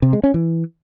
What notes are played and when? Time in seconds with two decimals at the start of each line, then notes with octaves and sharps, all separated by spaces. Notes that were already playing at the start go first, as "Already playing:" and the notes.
0.02 C3
0.13 G#3
0.24 C#4
0.34 E3